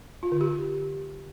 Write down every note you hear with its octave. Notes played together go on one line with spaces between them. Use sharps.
F4
D3
G4